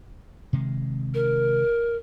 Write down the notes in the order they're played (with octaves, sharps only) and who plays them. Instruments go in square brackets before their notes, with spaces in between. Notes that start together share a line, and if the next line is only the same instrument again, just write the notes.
[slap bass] C3 D#3 G#3
[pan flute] A#4